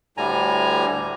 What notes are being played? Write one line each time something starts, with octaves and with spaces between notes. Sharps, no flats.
D2 A2 D3 G3 G#5 A#5